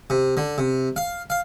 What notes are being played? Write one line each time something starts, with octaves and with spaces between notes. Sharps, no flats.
C3
D3
C3
F5
F5